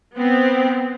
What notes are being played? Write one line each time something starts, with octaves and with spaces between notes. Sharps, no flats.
B3 C4